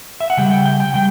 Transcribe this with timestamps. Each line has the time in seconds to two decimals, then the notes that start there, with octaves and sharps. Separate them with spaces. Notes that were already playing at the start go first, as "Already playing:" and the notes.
0.20 E5
0.30 F#5
0.37 C#3 G3 G5
0.51 G5
0.66 G5
0.80 G5
0.94 C#3 G3 G5